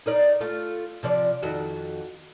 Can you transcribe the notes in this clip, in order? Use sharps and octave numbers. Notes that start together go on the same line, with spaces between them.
D#4 A#4 D5
A3 F4
C3 F3 D5
F2 D#3 F#4